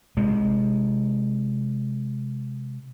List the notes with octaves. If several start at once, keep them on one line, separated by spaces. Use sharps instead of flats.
C3 G#3